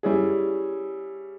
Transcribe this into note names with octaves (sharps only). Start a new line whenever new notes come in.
G3 C#4 E4 G#4